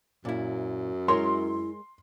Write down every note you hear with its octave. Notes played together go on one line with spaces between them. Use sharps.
F#2 A#2 E4
G#3 E4 A#4 C#5 C6